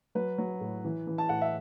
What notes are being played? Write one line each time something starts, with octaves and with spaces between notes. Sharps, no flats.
F#3 B4
F#3
A2
E3
E3
A5
A2 F#5
E5